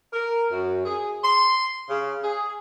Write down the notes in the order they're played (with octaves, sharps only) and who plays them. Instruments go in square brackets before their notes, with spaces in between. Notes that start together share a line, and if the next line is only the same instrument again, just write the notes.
[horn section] A#4
F#2
G#4
C6
C#3
G#4